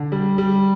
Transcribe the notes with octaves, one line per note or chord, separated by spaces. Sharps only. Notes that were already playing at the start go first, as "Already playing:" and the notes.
Already playing: D3
G3
G3